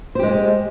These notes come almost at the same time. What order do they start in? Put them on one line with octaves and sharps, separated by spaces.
C5 G4 G#3